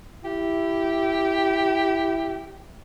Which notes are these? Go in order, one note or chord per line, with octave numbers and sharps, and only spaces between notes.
E4 G4